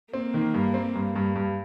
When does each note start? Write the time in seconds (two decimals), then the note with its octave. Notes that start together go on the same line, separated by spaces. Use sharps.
0.14 A#3 C4
0.34 D#3
0.54 G2
0.74 C4
0.95 G2
1.16 G2
1.36 G2